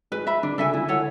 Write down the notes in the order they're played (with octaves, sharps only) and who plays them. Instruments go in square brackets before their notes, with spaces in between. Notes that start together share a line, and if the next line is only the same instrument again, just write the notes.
[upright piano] G#3 [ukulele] B4
[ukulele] E5 B5
[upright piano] D3 [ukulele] D4
[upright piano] C#3 [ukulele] A4 E5 G#5
[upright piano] D3 [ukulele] E4
[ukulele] A4 C#5 F#5